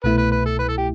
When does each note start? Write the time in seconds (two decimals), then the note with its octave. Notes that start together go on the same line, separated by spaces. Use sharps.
0.04 C2 B2 A3 E4 B4
0.18 B4
0.32 B4
0.45 A4
0.59 B4
0.69 A4
0.78 G4